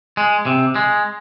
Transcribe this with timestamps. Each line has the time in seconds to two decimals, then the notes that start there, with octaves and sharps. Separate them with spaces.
0.17 G#3
0.46 C3
0.76 G#3